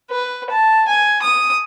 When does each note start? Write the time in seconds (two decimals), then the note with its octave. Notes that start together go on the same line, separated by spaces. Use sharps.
0.11 B4
0.50 A5
0.88 G#5
1.22 D#6